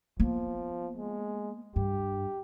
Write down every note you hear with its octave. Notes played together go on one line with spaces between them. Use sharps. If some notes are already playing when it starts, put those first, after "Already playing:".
F3 A#3 B3
G#3
G2 G4